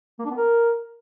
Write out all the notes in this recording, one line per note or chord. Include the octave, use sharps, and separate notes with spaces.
A#3
D4
B3
A#4